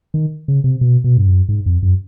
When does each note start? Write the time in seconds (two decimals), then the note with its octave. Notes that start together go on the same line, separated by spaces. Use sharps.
0.14 D#3
0.48 C#3
0.64 C3
0.81 B2
1.04 B2
1.17 G2
1.26 F#2
1.49 G#2
1.66 F2
1.83 F#2